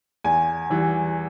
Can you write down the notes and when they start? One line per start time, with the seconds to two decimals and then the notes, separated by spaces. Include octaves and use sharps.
0.24 E2 G#5
0.70 E3 G3